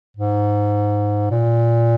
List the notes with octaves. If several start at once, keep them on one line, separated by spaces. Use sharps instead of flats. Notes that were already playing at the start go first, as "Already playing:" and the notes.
G#2
A#2